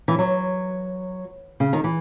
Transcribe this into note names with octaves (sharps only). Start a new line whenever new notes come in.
E3
F#3
C#3
D#3
E3